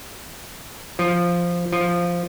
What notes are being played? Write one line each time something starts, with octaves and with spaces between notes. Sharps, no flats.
F3
F3